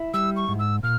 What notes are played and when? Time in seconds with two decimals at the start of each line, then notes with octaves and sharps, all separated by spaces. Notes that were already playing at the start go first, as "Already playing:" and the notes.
Already playing: E4
0.14 G3 E6
0.36 C#6
0.48 G#2
0.60 E6
0.83 A#2 F6